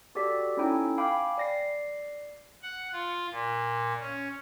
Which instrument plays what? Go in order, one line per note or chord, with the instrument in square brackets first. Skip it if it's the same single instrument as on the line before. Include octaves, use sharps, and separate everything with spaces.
[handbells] F#4 G4 A4 D5 B6
C#4 D#4 E4 A4 G5 G#5
F5 G5 G#5 B5 D6
D5 A#6 C7
[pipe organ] F#5
F4
A#2
C#4